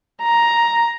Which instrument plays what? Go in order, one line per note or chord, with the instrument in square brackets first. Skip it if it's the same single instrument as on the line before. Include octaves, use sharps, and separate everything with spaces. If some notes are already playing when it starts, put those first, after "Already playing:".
[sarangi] A#5